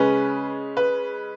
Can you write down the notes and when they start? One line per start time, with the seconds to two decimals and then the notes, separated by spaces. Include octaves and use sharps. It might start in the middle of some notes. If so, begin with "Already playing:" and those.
Already playing: C#3 G#3 C#4 B4
0.77 B4